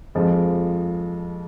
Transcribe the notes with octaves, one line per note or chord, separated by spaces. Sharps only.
F2 F3 G#3